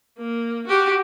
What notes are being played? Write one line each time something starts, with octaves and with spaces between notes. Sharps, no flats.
A#3
F#4 G4